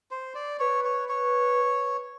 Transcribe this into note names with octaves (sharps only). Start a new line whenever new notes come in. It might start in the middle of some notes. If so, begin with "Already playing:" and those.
C5
D5
B4 C#5
C#5
C#5